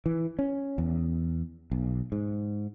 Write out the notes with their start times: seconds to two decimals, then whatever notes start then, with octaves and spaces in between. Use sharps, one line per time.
0.06 E3
0.39 C#4
0.78 E2
1.72 B1
2.12 G#2